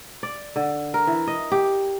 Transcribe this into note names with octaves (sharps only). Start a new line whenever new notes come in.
D5
D3
A#4
E3
D#5
G4